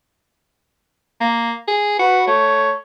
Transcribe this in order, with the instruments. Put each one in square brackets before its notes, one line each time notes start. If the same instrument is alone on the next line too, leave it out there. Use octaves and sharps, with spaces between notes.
[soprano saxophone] A#3
G#4
[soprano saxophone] F#4 [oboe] B4
[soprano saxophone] A3 [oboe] C#5